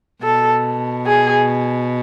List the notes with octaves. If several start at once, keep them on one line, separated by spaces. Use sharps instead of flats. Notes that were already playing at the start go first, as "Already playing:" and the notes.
B2 A4
G#4